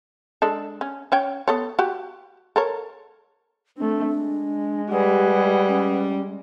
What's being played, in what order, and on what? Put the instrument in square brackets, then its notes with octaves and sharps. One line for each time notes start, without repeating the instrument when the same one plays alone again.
[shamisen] G#3 D4 A4
C#4
C#4 C#5 G5
B3 A4 C#5
F#4 G4
A4 A#4 C#5
[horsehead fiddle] A3 C4 [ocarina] D4
[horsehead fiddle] G#3
[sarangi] G3 [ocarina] G4 [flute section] G#4 B4 F#5
[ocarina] C#4